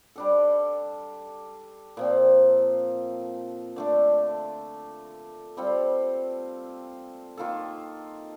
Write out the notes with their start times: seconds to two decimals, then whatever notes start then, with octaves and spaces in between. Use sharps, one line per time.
0.16 G3 D4 A4
1.97 A#2 F3 C4
3.76 D3 A3 D4 A4
5.57 G3 C4 F4 A4
7.37 D#3 A#3 F4 A4